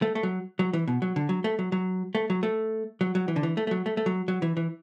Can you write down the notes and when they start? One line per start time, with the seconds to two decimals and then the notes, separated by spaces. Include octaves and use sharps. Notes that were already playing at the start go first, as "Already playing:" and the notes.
0.02 A3
0.15 A3
0.23 F#3
0.59 F#3
0.73 E3
0.88 B2
1.02 F#3
1.16 D3
1.29 F#3
1.44 A3
1.59 F#3
1.72 F#3
2.15 A3
2.30 F#3
2.43 A3
3.01 F#3
3.15 F#3
3.28 E3
3.36 D3
3.43 E3
3.57 A3
3.67 A3
3.71 F#3
3.86 A3
3.97 A3
4.06 F#3
4.28 F#3
4.42 E3
4.57 E3